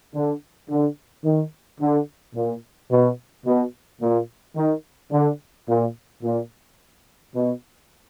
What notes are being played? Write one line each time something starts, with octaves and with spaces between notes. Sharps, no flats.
D3
D3
D#3
D3
A#2
B2
B2
A#2
D#3
D3
A#2
A#2
B2